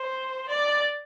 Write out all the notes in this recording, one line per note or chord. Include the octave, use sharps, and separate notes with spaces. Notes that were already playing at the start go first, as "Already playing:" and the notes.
Already playing: C5
D5